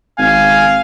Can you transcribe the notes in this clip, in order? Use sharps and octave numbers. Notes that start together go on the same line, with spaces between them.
G#1 F5 G#5